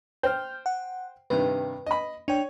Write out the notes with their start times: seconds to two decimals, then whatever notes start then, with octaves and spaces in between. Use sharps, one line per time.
0.23 C5 G5 F6 G6
0.66 F#5
1.30 G2 C3 D#3 B4
1.86 D#5 B5
2.28 D4 C#5 G5